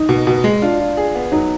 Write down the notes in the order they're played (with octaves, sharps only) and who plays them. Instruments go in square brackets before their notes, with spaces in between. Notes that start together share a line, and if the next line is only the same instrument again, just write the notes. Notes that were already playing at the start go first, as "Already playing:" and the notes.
Already playing: [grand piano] D#4
[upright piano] B2
B2
G#3
[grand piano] D4 [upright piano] F4
[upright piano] F4
G#4
B3
[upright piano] F#3 [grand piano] D#4